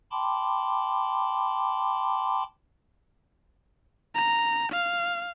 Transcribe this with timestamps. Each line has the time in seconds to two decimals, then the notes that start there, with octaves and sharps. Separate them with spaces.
0.11 G5 A5 B5 C6 D6
4.15 A#5
4.72 F5